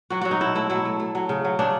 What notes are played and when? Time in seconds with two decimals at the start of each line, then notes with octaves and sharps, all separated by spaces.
0.10 F#3 F#4
0.21 F#3 F#4
0.31 D#4
0.41 B2 E4
0.55 A3 E4
0.70 F#3 E4
0.85 A3
1.00 A3
1.15 F#3
1.29 C#3
1.45 F#3
1.59 C#3 D4